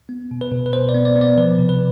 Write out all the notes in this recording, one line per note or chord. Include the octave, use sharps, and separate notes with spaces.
B3
B2
B4
B2
B4
B2 C5
D5
B3
D5
B3
D5
F3 B4
C3
B4